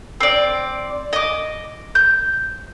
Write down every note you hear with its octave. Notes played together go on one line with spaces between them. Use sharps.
C4 D5
D#5 D6
G6